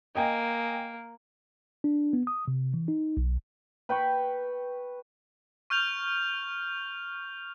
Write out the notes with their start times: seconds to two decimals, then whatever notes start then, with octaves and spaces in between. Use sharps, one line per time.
0.15 A#3 D#5 G5 G#5
1.84 D4
2.13 B3
2.27 D#6
2.48 C3
2.74 E3
2.88 D#4
3.17 B1
3.89 B4 G5 B5 C#6
5.70 C#6 F6 G6 F7